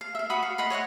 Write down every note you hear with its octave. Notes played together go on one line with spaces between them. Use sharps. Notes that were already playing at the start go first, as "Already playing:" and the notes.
F5
E5 F5
F#4 B5 C#6 D#6
F5
D#5 F#5 B5 C6
C#5 D#5 E5 F#5